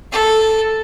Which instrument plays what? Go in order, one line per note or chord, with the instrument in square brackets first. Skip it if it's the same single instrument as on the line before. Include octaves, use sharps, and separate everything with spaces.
[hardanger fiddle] A4